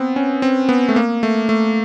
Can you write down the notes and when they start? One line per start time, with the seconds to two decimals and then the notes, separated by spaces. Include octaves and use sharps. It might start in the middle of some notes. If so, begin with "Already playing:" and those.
Already playing: B3 C4
0.16 C#4
0.42 C4
0.69 B3
0.89 A3
0.96 A#3
1.23 A3
1.49 A3